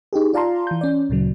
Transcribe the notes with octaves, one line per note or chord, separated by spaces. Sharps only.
D#4 G4 G#4
F4 D5 F5 A5 A#5 C6
E3 G6
C#4 D5
D2 A#2 C#3 F#3